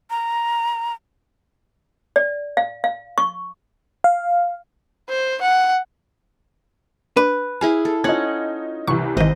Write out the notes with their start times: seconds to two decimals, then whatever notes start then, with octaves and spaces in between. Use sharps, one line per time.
0.10 A#5
2.16 D5
2.57 F5
2.84 F5
3.18 C#6
4.04 F5
5.09 C5
5.41 F#5
7.17 D4 B4
7.61 E4 G#4 F5 G#5
7.85 A4
8.04 C#4 D#4 F4 F#5 G#6
8.87 C2 C3 E3 C#6
9.17 G#1 D#3 C5 D#5